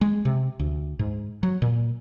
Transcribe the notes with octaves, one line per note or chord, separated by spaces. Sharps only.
G#3
C3
D2
G#2
F#3
A#2